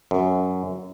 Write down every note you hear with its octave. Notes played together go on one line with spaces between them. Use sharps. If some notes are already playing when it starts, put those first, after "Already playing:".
F#2